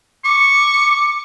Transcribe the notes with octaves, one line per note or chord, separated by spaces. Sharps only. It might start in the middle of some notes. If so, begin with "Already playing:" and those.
C#6 D6